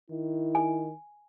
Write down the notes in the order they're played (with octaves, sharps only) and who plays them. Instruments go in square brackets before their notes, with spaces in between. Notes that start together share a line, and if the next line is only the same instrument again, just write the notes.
[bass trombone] D#3 [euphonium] E4
[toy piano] G#5